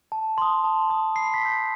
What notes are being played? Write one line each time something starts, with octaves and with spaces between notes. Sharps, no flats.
A5
C6 D#6
A5
C6 D#6
B5 C7
B6
E6 G6
B6